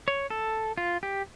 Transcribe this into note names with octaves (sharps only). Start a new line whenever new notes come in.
C#5
A4
F4
G4